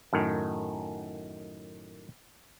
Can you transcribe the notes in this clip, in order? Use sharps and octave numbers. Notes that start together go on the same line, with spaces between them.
F#2 A2 D#3